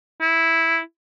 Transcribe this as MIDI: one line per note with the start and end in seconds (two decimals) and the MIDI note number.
0.21 0.80 64